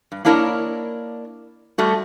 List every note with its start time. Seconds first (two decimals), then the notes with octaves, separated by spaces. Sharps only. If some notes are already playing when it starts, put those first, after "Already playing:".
0.12 G2
0.25 A#3 D4 E4 A#4 C#5 D#5
1.78 G3 A3 F#4